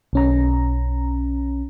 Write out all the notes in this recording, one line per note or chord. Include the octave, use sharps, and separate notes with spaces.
B1 C#4 A#5